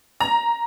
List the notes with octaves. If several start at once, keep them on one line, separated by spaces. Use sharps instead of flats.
A#5